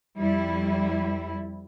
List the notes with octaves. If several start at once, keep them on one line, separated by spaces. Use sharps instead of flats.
F2 G3 E4